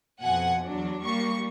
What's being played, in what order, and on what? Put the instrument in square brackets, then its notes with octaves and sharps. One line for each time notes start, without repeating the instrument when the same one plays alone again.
[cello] F2 B2 [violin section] F#5 G#5
[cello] E2 F#3 [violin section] D4
[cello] G3 A#3 [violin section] C#6